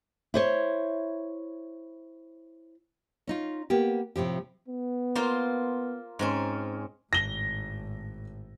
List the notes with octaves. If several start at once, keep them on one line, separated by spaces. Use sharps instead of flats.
E4 C5 C#5
C#4 D#4 F4
A#3 B3 G4
A2 C3 F3 G4
B3
A#3 F4 C5
G#2 C4 C#4
G#1 A2 A#6 G7